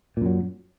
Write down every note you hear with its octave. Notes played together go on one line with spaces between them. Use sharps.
F#2 A#2 F#3